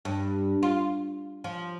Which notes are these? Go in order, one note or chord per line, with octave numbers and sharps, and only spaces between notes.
G2
F4
F3